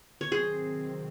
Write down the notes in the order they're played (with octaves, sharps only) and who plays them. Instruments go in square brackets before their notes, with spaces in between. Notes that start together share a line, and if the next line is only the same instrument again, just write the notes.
[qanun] C#5
[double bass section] C3 D#3 F#3 C4 [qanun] G#4 C5